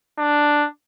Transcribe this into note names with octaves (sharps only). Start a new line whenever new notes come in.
D4